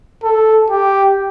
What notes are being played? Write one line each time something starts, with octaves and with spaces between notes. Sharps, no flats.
A4
G4